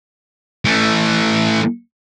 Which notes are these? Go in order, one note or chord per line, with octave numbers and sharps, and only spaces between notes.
E3 A3